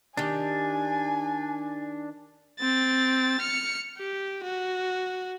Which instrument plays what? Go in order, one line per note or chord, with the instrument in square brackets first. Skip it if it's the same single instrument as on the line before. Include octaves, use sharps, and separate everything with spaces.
[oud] D#3 G4 [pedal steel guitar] D4 [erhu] G#5
[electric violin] C4 A6
F6 C#7
G4
F#4